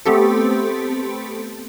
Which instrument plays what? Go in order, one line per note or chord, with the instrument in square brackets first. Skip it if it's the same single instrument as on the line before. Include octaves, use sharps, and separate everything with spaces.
[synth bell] A3 B3 C4 G4 A4